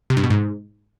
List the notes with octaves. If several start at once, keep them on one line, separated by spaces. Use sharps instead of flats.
C3
G2
B2
G#2